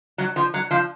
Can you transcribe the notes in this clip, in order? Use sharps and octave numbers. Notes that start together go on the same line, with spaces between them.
F#3
F3
F#3
F3